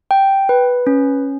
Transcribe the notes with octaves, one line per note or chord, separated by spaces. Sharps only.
G5
B4
C#4